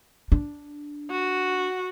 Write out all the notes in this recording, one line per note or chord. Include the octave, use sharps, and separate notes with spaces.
D4
F#4